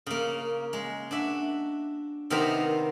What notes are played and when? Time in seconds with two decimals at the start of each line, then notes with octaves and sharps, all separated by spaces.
0.07 C#3 A#3
0.73 G#3
1.11 D4 F#4 E5
2.30 C3 D#3 B3 A#4 C5 A#5